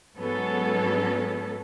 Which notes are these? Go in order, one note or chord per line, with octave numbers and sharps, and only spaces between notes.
G#2 F#3 B3 C#4 A4